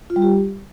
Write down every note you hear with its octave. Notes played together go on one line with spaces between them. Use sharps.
F4
G3
G4